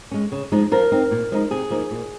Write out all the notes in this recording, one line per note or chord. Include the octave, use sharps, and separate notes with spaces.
G#3 C#4
C#3
F3 G#3 D#4
F3 A#4
C4 D#4
A#2
F3 G#3 C4 D#4
C3 G#4
F3 A#3 D#4
A#2